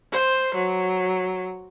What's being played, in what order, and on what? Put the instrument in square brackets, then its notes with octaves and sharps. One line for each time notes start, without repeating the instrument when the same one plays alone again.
[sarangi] C5
F#3